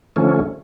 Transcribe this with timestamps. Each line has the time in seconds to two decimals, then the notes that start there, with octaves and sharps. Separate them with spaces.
0.16 D3 F3 A3 C#4